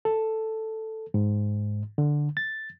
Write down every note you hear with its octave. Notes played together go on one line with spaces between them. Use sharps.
A4
G#2
D3
A6